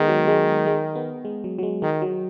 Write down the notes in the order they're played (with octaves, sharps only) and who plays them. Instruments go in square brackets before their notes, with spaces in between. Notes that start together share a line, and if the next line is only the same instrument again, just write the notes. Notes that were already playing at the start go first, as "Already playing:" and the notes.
Already playing: [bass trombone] D#3 [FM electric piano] G#3 B3
[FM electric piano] F#3
G#3
G#3
B3
G#3
F#3
F#3
G#3
[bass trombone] D#3 [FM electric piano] G#3
[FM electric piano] F#3